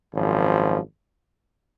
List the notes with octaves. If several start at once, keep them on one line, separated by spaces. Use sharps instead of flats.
G#1 F#2 F3